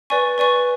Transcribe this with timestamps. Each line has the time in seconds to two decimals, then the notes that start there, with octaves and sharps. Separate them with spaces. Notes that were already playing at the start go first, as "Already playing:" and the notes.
0.10 B4 D5 G#5 C#6
0.38 B4 D5 G#5 C#6